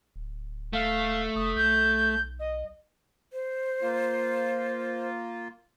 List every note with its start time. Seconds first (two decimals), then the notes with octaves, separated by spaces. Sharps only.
0.16 D1
0.73 A3 F5
1.36 F1 D#6
1.56 B1 G6
2.39 D#5
3.33 C5
3.82 A#3 F4